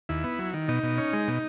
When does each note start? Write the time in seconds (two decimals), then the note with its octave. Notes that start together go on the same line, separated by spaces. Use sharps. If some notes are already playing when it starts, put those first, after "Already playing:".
0.09 D#2 E4
0.24 B3
0.39 F#3
0.54 D#3
0.68 B2 D#4
0.83 B2
0.98 C#4
1.13 G#3
1.28 B2